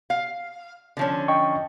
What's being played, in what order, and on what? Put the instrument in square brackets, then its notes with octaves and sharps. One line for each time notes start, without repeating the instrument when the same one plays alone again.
[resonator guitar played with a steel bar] F5
D3 F3 C#4
[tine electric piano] D#5 G5 C#6